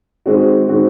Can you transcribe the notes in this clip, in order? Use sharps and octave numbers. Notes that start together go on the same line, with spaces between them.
D#3 G#3 C4 F#4
D#3 G#3 C4 F#4